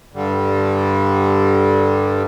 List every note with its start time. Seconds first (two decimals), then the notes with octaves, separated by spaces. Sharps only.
0.14 G2 D3 G3